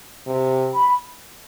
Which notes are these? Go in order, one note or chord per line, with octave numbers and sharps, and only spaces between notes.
C3
B5